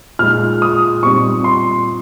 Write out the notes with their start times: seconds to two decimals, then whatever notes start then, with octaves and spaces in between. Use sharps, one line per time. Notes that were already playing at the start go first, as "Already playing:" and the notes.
0.19 A#2 G#3 D#4 F6
0.62 D#6
1.03 A#2 G3 C4 D#4 C#6
1.44 C6